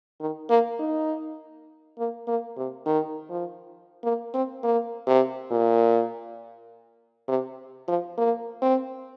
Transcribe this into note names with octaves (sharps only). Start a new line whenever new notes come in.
D#3
A#3
D#4
A#3
A#3
C3
D#3
F3
A#3
C4
A#3
C3
A#2
C3
F3
A#3
C4